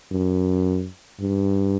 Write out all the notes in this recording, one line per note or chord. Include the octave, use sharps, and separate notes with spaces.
F#2
G2